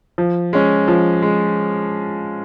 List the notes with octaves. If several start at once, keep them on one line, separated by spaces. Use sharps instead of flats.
F3
G#3 C#4
F3
G#3